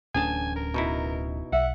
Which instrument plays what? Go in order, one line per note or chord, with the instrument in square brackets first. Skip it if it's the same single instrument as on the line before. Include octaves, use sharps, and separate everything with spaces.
[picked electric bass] D1 C#4 D4 [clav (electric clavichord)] A1 A5 [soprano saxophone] G#5
[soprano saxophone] A#4
[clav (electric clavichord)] B2 D#4 E4
[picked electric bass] B1 [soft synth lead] E5 [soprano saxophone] F#5